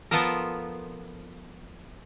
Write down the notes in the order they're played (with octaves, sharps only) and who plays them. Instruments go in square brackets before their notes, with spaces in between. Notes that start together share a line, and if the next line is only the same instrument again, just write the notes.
[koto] F3 B3 F4 A4 A#4